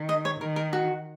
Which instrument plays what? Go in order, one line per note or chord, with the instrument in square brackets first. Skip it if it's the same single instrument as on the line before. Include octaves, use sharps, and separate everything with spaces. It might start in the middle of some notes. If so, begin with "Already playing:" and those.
Already playing: [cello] D#3
[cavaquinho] D#5
C#5
[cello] D#3 [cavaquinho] A#4
[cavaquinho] A#4
F#4